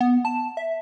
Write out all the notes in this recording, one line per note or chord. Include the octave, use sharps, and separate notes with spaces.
B3
A5
E5